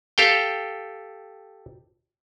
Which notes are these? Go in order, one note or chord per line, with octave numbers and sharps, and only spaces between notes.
G4 A4 F5 G5